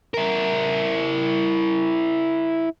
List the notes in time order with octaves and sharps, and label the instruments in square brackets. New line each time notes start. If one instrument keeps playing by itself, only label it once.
[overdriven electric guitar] E4 A#4